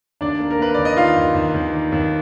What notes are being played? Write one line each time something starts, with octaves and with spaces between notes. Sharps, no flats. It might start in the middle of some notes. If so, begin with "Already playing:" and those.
D#2 D4 D5
A#3
A#4
A#3 B4
D#2 D5
D#5
D#3 F4 F5
D#2
D#2
D#2
D#3
D#2